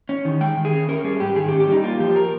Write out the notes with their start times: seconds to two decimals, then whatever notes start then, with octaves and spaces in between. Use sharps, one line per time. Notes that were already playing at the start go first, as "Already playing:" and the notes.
0.09 C#4
0.25 D#3
0.41 G#3 G5
0.57 D#3
0.65 G#4
0.73 C#4
0.88 C#4 A#4
1.04 G3 G#4
1.20 G#2 G4
1.36 D#3 G#4
1.48 G4
1.52 C#4
1.60 G4
1.68 G3 D#4
1.83 A#3 F4
2.00 F3 G4
2.16 A#4